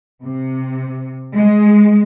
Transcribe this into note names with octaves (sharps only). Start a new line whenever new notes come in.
C3
G#3